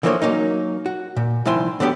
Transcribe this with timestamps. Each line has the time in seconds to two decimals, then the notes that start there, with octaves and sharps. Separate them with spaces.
0.03 D3 E3 F3 A#3 B4 C#5
0.22 F#3 A#3 C#4 D#4
0.86 F#4
1.16 A#2
1.46 C2 D#3 F3 E4 G#5 C6
1.80 D3 F#3 B3 G4